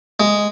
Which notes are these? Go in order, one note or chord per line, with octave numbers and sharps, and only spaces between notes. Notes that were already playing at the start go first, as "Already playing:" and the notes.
G#3